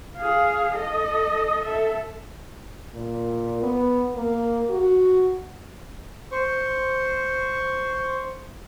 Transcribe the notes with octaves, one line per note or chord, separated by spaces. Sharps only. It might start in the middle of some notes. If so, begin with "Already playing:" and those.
G#4 F5
A4 D#5
A4 E5
A#2
B3
A#3
F#4
C5 C#6